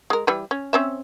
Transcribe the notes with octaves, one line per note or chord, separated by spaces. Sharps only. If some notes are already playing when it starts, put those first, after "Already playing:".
G#3 A#4
E3 G3 B4
C#4
C4 C#4 E5